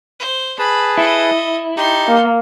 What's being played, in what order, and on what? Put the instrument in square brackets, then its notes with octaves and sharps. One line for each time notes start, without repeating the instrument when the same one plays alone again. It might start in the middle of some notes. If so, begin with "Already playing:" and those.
[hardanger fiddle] C5
[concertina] G#4 B4 A5 [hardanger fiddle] B5
[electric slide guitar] E4 [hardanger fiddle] A4 D#5
[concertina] D#4 G4 [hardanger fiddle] A4 C6
[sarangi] A#3